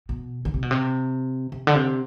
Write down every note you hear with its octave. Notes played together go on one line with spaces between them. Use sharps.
B2
D3
C3
B2
C3
C3
D3
C3